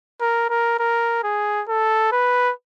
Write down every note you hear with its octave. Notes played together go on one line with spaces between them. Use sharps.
A#4
A#4
A#4
G#4
A4
B4